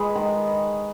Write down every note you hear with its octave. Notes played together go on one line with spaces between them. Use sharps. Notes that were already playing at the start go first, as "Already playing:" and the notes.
Already playing: G#3 B4
D#3